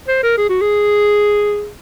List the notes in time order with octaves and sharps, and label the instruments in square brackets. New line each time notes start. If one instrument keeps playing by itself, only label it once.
[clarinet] C5
A#4
G#4
F#4
G#4